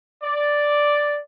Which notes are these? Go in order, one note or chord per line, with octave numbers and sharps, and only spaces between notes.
D5